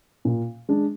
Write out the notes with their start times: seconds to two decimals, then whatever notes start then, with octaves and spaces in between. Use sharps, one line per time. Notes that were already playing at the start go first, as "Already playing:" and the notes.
0.25 A#2
0.69 G#3 D4